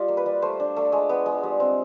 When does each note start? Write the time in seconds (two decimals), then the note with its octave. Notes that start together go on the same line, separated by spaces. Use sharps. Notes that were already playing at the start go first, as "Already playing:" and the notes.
Already playing: G3 F4 D#5
0.08 A#3
0.17 B4
0.26 G3
0.42 A3 C5
0.60 D4
0.76 A3
0.92 G#3
1.09 B3
1.26 G#3
1.43 G3
1.60 C4